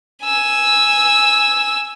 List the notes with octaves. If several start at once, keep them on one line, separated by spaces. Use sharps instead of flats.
G#5 E6